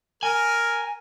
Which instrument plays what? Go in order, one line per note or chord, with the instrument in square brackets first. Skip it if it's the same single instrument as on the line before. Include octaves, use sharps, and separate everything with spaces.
[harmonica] A#4 [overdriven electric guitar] G#5